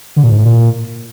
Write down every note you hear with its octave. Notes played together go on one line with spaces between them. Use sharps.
D3
A#2
G#2
A2
A#2